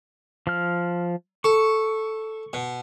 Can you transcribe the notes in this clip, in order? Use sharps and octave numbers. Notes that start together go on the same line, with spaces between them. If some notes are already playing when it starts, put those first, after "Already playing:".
F3 F6
A4 C#6
B2